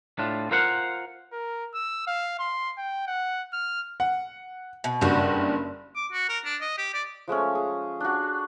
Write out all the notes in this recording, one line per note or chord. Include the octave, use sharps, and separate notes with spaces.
A2 D4 F4
F4 A#4 C5 F5 F#5
A#4
E6
F5
C6
G5
F#5
F6
F#5
B2
F#1 G2 G3 F#4
D6
F#4
A#4
D4
D#5
G4
D5
F3 G#3 A3 C#4
G#4
D4 F#4